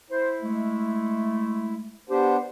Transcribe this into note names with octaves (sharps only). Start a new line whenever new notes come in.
E4 C5
G#3 A3
B3 D4 G4 C5